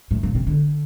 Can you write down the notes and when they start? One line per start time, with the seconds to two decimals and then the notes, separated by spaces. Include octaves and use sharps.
0.11 A2
0.23 A#2
0.35 C3
0.47 D3